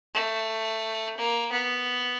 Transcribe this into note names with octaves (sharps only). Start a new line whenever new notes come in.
A3
A#3
B3